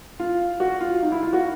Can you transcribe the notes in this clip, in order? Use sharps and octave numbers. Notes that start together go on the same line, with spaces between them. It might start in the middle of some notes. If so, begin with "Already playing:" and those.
F4
F#4
F4
D#4
E4
F4
F#4